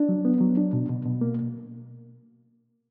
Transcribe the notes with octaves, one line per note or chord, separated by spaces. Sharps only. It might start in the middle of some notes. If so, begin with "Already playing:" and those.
Already playing: D4
F#3
B3
F#3
D4
B2
B2
B2
A#3